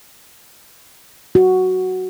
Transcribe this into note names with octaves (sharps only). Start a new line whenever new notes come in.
F#4